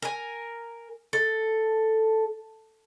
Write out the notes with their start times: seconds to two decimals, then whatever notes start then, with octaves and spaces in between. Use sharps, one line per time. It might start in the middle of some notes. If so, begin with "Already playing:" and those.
0.02 A#4 G#5
1.13 A4